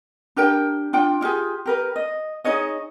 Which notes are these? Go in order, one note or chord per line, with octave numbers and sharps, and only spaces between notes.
D4 G4 A#4 G5
D4 F4 G5
E4 F4 G4 G#4
G4 A#4 B4
D#5
D#4 G#4 C#5 D#5